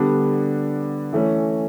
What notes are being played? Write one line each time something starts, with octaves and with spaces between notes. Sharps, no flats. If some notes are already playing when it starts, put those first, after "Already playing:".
Already playing: D3 G3 B3 D4
E3 A3 C#4